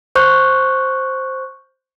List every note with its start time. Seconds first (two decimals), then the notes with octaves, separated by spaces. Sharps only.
0.15 C5 C#6 F#6 G6